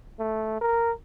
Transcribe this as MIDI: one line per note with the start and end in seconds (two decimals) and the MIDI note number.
0.19 0.56 57
0.61 0.91 70